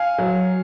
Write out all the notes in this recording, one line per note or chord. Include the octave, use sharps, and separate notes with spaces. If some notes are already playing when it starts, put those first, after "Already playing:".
Already playing: F5 G#5
F#3